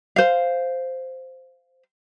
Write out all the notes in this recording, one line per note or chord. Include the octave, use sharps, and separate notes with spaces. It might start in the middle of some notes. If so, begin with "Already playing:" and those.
C5 F5